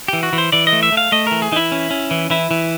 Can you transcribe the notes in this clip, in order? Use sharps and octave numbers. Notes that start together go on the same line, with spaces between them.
E3 G4
F#4
E3
C5
E3 D5
D#5
A3
E5
A3
F5
A3 D#5
E3 A#4
G#4
E3 D#4 E4
C#4
C#4
E3
E3 E4
E3